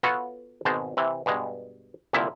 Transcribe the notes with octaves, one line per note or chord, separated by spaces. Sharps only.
B3 F4 F#4 A4 B4 C#5
G#1 B2 G#3 C5 A5
C3 E3
G2 B2 G#3
C2 A#2 D3 F3 E4 E5